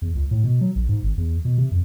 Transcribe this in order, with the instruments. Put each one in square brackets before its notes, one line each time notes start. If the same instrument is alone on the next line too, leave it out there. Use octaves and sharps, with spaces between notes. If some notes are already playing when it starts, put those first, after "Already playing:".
[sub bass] E2
C#2
A2
B2
F#3
A#1
G#2
G#1
E2
B2
C3
F2